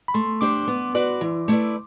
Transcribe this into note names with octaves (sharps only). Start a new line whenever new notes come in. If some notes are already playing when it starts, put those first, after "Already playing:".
B5
A3 C6
D4 G4 C5 D6
B3
F#4 B4 D5
E3
A3 E4 B4 D5